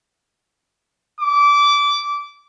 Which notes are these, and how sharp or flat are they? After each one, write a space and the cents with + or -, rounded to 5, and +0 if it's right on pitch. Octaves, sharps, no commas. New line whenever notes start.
D6 -20